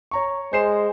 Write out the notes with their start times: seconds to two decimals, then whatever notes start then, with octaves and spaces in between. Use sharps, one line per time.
0.11 C#5 A#5 C#6
0.53 G#3 C5 C7 E7